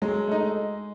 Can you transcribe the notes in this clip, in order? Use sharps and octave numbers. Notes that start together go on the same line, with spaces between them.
F#3 G#3
A3 D#4